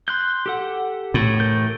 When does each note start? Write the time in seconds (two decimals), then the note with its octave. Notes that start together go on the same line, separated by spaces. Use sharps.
0.08 C6 F#6 G6
0.46 G4 A4 F#5
1.14 A2
1.40 E3 A#4 G6